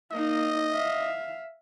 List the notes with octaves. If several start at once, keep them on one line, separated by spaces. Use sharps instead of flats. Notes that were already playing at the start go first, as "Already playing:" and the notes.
A#3 D#4 D#5
E5 F5